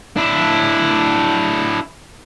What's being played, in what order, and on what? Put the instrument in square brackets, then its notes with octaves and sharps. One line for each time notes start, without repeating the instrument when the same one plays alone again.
[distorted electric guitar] D4 E4